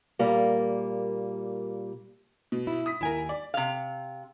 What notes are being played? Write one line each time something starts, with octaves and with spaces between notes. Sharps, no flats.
A#2 G3 A#3
B2
E4
D#6 B6
D#2 E4 A#4 G#5
D5
C3 F5